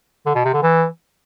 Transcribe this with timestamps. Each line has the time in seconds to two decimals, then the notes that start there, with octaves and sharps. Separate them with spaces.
0.26 D3
0.35 B2
0.45 C3
0.53 D3
0.63 E3